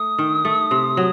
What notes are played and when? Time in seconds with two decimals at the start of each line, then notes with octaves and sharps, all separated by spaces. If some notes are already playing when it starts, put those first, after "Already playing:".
Already playing: A3 D#6
0.18 D#3
0.45 A3
0.71 C3
0.97 F#3